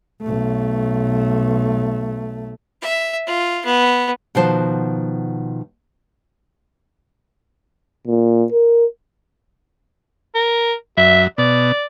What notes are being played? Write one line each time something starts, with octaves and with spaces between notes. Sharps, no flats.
B1 A3
E5
F4
B3
B2 D#3 F3 F#4 C5 A5
A#2
A#4
A#4
F#2 E5
B2 D5